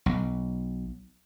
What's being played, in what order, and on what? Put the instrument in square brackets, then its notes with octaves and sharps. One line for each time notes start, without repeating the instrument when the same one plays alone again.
[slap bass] B1